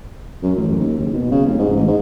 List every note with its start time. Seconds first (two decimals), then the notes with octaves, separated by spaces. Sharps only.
0.43 F#2
0.56 A1
0.79 D#2
0.99 F#1
1.13 B2
1.31 C#3
1.46 F1
1.59 G#2
1.76 A1
1.88 G#2